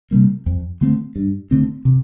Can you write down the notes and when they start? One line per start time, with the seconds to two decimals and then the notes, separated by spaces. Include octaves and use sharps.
0.11 C3 G3 A#3
0.46 F2
0.81 D3 A3 C4
1.16 G2
1.51 D3 A3 C4
1.85 C3